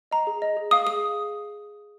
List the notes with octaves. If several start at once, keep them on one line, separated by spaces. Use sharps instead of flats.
D#5 A#5
G#4
D#5
G#4
F5 D#6
G#4 D#6